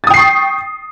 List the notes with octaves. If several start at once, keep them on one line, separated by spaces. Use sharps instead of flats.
G5 C#6 D#6 A6 C7